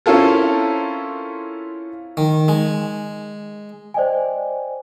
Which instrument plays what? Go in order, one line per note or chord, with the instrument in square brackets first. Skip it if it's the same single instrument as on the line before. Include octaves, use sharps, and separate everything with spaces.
[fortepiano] C4 C#4 E4 F4 A4 A#4
[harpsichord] D#3
G#3
[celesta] C5 D5 D#5 G5 G#5